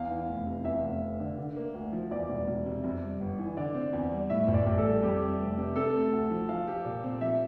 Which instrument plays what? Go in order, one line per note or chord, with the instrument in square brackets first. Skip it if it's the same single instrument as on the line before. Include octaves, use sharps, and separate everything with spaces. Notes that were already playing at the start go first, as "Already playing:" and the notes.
Already playing: [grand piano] E2 [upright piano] F5
[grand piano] E3
F1
C3
[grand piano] E2 [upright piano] E5
[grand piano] F1
F1
D3
D3
A#3
D2
F3
[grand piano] E2 [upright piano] D5
[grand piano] E1
E1
C3
F2
G3
G1
E3
[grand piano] D3 [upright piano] D5
[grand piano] C4
E2
G3
[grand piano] A2 [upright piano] E5
[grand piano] A1
[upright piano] D5
[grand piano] A1
[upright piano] A4
[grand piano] G3
[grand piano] F2 [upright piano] G4
[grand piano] G3
F1
C3
[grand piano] C3 [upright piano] A4
[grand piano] A3
D2
F3
[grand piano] F3 [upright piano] F5
[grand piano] G4
A#2
C4
[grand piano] F3 [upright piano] E5